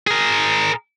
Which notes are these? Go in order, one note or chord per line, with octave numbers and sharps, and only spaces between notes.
G#4 A#4